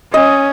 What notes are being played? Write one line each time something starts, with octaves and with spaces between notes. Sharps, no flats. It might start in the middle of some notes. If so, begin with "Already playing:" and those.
C#4 D#5